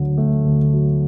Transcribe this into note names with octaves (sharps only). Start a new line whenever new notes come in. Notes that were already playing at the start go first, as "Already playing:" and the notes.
Already playing: D2 D3 F#3
A3
D2
F#3